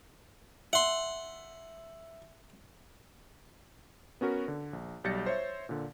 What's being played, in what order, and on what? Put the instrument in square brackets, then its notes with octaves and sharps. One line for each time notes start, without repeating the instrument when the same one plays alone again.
[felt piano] E5 [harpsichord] F#5 C6
[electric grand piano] B3 C#4 F#4 A#4 B4
D3
A#1
B1 G3 G6 A6 A#6 C#7
C5 C#5 E5
A#2 D3